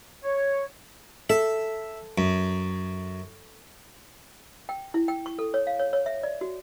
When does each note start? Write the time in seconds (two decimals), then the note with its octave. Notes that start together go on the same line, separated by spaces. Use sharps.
0.24 C#5
1.30 A4 E5
2.18 F#2
4.69 G5
4.94 E4
5.08 G5
5.26 C#6
5.39 A4
5.54 C#5
5.67 F5
5.79 C#5
5.93 C#5
6.06 E5
6.23 D5
6.41 F#4